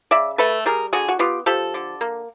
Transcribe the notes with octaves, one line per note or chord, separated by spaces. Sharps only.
C#3 D5 E5
A3 A4 B4
G3 G#4 A#4
D3 F#4 G#4
F#4
B3 F4 G4
F3 G4 A4
D3
A#3